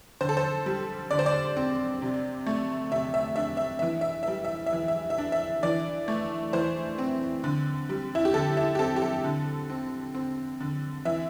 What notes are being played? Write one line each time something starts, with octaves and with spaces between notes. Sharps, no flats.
D3 C5
A4
C5
G3
D3 D5
C5
D5
C4
C3
A3
C3 E5
E5
D4 E5
E5
E3 E5
E5
G3 E5
E5
E5
E3
E5
E5
D4
E5
E3 D5
A3
E3 C5
C4
D3
G3
E4
G4
D3 A4
E4
G4
C4 A4
G4
A4
D3
C4
C4
D3
E3 E5